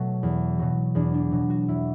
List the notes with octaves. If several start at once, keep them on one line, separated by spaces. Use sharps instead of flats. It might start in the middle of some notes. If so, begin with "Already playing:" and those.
Already playing: B2 F#3 A3
E2
B2 F#3
E2 D4
D4
B2 F#3
F#4
E2 E4